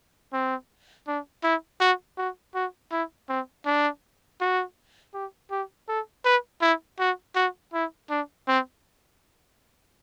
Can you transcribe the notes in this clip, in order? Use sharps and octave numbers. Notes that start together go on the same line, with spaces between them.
C4
D4
E4
F#4
F#4
F#4
E4
C4
D4
F#4
G4
G4
A4
B4
E4
F#4
F#4
E4
D4
C4